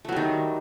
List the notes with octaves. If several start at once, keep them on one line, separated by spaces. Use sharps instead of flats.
D#3 F#3 G3 A3